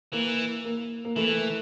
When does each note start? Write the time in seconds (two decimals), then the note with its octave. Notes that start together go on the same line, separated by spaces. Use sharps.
0.13 E3 A#3
0.64 A#3
1.05 A#3
1.16 E3 A3